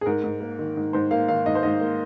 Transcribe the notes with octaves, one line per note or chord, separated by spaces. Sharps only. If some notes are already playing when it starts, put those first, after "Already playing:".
G#4
G#2 A#4
G#2
A#3
D#3
G#2
G#2 C5
A#3 F5
D#3 F5
G#2 D#5
C5
G#2 D#5
A#3